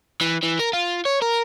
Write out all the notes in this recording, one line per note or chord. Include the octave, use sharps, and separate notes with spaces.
E3
E3
A#4
F4
C#5
A#4